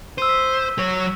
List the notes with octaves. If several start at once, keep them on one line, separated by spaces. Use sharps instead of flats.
C5 E6 D#7
B6
F#3 C#5